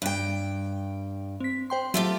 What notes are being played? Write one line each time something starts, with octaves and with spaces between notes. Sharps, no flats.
G2 G5
C4 B6
C5 G5 C6
F#3 A3 F4 G4